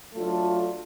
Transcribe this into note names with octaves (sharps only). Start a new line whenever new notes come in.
F#3 A3 D4 F4